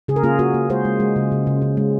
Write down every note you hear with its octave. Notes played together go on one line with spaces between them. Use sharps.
C#3 G#4
A#4
A#3 F4 G#4
A#3 F#4 A#4
A#3
G#3 G#4 C5
G#3
G#3
C#3
C#3
C#3
C#3
G#3